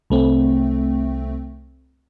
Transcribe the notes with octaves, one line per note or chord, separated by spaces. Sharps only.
C2 A3 C4